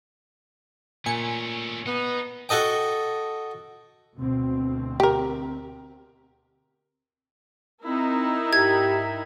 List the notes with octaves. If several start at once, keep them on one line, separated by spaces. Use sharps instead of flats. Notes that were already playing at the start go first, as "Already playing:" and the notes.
A#2 A3 C#4 G#5 C#7
B3 D#4
F#4 A4 D#5 G5
D2 B2 C4
G4 A#4
C4 D#4 E4 A#4
G#2 G4 E5 G#6